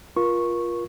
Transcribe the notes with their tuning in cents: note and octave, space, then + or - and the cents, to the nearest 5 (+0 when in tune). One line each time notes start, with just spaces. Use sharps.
F4 +0 A#4 +35 C#6 -10